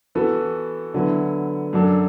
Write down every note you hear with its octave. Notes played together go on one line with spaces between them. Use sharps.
E3 B3 F#4 A4
D3 F#3 B3 E4
F#2 F#3 D4 A4